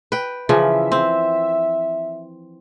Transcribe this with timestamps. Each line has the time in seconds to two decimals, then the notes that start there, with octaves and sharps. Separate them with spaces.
0.12 B4 G5
0.49 C#3 E3 F3 E5
0.92 C4